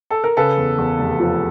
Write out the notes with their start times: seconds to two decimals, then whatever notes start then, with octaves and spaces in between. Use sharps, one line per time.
0.11 A4
0.24 A#4
0.37 C#3 A4 B4
0.57 E2
0.78 E2
0.99 F1
1.20 F3